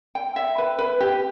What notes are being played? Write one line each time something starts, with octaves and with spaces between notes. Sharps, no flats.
G5
E5
B4
B4
G4